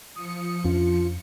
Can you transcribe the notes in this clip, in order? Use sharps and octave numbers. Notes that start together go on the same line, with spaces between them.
F3 D#6 C#7
F2 C#4 D4 F4